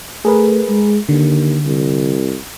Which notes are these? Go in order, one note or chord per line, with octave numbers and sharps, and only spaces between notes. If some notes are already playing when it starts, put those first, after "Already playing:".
A3 G#4 A#4 B4
G#3
D#2 D3
C2